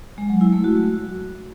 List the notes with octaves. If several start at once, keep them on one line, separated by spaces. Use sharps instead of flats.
G#3
F#3
E4
A3
F#4